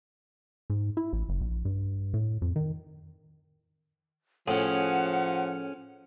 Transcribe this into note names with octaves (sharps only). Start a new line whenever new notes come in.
G#2
E4
A1
F#1
A#1
G2
A2
F2
D#3
A2 F3 C#4 G#4 F#5